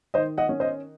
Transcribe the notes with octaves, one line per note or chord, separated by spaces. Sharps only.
D#3 C5 D#5
D#5 F#5
C#4
C5 D#5